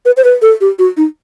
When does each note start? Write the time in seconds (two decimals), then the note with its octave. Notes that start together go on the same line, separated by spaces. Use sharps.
0.05 B4
0.17 C5
0.24 B4
0.42 A4
0.61 G4
0.79 F#4
0.97 D#4